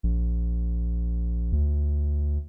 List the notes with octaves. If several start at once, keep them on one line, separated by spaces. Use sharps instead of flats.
A#1
D2